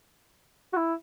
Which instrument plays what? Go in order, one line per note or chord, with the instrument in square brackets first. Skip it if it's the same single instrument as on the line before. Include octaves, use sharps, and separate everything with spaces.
[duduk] F#4
E4